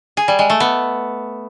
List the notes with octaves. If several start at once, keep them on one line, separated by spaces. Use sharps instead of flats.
G#4
G3
G#3
A3
B3